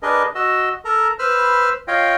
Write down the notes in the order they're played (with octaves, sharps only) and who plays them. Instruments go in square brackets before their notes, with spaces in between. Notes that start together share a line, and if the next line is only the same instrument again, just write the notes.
[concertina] D4 G#4 A#4 B4 D#5
F#4 D#5 E6
A4 A#4 A#5
B4 C5 B5 E6 F6
F4 C#5 D#5 F5 G5